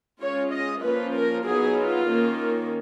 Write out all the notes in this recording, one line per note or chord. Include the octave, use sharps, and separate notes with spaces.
G#3 C#4 F4 C#5
D#5
F3 A#3 C#4 F4 B4
A#4
F#3 B3 D#4 G#4
F4
D#3 A#3 C#4